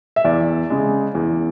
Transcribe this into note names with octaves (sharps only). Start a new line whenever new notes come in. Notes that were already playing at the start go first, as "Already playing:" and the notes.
E5
E2 D5
C#3 G#3
E2